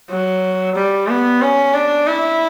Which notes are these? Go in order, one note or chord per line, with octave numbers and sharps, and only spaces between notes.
F#3
G3
B3
C#4
D4
E4